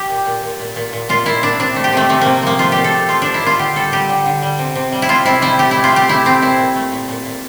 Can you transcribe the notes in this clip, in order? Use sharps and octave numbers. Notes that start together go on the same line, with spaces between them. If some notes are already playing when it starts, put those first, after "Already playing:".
Already playing: G4
A#2
A#2
A#2
A#2
A#2
A#2
A#2 F4
A#2 E4
A#2 D4
C3 D4
A3
G4
C3 A3
C3 A3
C3 A#3
F3 A#3
A3 F4
A#2 G4
A4
A3
F3 F4
A#2 D4
E4
A#2 F4
D3 G4
G3 A4
G3 G4
D3
D3
G3
C3
C3
G3
E4
C3 F4
C3 E4
G3 E4
A3 G4
A3 E4
F4
A3 G4
A3 E4
A3 C4
A#2 E4
A#2
A3
A#2
A#2
A#2